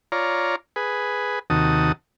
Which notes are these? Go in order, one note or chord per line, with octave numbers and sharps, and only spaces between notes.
F4 C#5 D5 A#5
G#4 B4
D#2 C3 D#3 F#4 A5 D#6